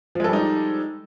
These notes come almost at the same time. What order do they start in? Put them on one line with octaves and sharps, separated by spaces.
F3 G#3 A4 G3 D#4